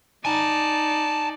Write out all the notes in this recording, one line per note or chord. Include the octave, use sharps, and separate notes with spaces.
D#4 D5 G#5 A5